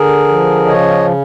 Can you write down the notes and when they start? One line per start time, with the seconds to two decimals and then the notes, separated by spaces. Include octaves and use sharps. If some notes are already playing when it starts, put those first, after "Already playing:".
Already playing: D3 G#4 A#4
0.28 F3
0.66 C#3 C#5 D#5